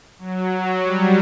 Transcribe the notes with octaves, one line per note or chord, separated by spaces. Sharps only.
F#3
G3